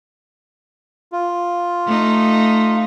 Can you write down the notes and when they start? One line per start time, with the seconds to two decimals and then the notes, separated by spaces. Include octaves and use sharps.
1.12 F4
1.86 A3 D#4